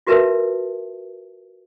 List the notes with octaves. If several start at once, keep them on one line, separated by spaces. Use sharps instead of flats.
F4 F#4 A#4 B4 E5 A5